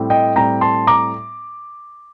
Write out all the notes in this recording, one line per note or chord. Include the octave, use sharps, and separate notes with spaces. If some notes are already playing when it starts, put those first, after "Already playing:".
Already playing: A2 G3 C4
D#5 G5
A2 G3 C4 G5 A#5
A5 C6
A#5 D6